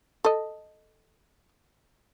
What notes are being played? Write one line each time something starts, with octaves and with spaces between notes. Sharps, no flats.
A4 D#5